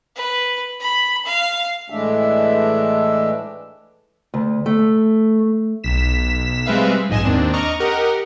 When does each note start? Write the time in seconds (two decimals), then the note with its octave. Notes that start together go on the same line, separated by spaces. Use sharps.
0.16 B4
0.80 B5
1.25 F5
1.90 A2 E3 G#3 A3 D4 E5
4.34 D2
4.66 A3
5.84 B1 B6 E7
6.66 G3 G#3 C4 B4 E5 F5
7.10 A#1 G#2 D#5 G#5 E7
7.25 D#2 D#3 C4 D4
7.53 D#5 A#5 C#6 D6 F6
7.80 G4 A#4 D#5 F#5